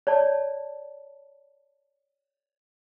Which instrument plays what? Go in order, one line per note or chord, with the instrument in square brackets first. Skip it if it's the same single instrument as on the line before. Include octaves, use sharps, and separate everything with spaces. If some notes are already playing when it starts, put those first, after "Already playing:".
[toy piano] C#5 D5 A5